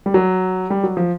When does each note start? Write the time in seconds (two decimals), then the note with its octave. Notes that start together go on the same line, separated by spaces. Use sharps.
0.06 G3
0.14 F#3
0.70 G3
0.84 F#3
0.97 F3